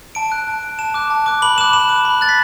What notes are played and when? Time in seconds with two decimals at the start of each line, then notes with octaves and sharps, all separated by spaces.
0.15 A5 D7
0.32 F#6
0.48 A5
0.63 F#6
0.79 A5 E7
0.94 D6 F#6
1.10 A5
1.26 D6 F#6
1.42 B5 F#7
1.58 D6 F#6 E7
1.73 B5 E7
1.89 D6 F#6
2.05 B5
2.21 F#6 A6
2.29 B6